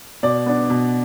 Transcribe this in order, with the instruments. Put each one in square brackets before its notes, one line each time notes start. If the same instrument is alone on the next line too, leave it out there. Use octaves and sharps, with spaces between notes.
[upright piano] B2 D5
B3 D4
B2